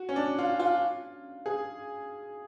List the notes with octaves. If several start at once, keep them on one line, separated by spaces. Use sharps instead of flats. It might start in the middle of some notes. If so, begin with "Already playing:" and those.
Already playing: F#4
C#4
D4
F4
F4
G#4